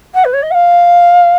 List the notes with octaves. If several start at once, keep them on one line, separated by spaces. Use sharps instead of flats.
F#5
B4
C#5
D#5
F#5
F5